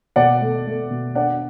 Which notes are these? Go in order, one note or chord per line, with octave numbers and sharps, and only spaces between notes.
B2 D5 F#5
A3
A3
B2
D4 D5 F#5